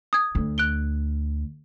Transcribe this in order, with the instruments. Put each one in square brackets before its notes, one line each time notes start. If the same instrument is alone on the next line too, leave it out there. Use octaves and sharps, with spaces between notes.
[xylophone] D#6 G#6
[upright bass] D2
[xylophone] F#6 D7 G7